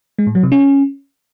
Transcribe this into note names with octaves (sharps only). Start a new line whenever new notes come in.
G#3
A2
F#3
C3
C#4